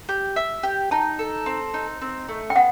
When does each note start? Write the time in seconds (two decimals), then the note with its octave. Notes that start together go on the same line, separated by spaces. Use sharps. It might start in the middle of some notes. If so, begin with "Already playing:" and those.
0.09 G4
0.36 E5
0.63 G4
0.91 D#4 A5
1.19 A4
1.46 C4
1.74 D#4
2.02 C4
2.29 A3
2.50 G5
2.56 B3 F#5